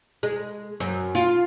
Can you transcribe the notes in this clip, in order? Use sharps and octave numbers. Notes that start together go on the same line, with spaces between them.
G#3
F#2
F4